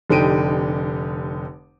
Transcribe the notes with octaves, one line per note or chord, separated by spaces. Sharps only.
F1 D3 D#4 G4 D7 D#7